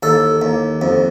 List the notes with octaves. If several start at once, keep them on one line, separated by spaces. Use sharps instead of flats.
D#2 A4
D#2
F2